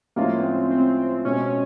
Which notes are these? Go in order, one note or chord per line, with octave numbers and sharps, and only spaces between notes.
A2 F3 G#3 A#3 C#4 F4
B3
C4
C4
B2 G#3 C4 C#4